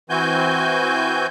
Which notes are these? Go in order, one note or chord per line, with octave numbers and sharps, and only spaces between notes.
E3 C4 F#4 G#5 G6